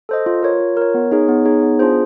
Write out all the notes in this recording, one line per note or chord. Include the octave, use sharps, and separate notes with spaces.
A4 C5 D#5
F4
A#4 C#5
F4
A#4 C#5
B3
D#4 G#4 C#5
B3
D#4 G#4 C#5
B3
D4 F4 G#4 C5